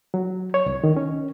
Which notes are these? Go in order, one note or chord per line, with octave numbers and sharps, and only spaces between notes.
F#3
C#5
C2
D#3
C#4